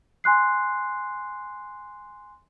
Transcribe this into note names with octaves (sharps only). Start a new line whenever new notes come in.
G#5 C6 F#6 C7